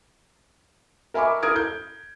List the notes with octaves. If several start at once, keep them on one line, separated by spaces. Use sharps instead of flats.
A#4 E5 G#5 B5 C#6 D6
E4 A4 A#4 D#6 G#6 D7
G6